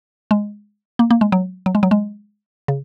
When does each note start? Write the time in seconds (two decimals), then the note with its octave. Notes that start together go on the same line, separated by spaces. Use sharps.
0.31 G#3
0.99 A#3
1.11 A#3
1.21 G#3
1.32 F#3
1.66 F#3
1.75 G#3
1.83 F#3
1.91 G#3
2.68 C#3